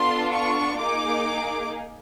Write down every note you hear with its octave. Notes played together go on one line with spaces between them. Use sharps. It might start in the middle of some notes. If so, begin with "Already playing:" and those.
Already playing: B3 D4 F4 A4 C6
C#6
A#3 D#4 G#4 D6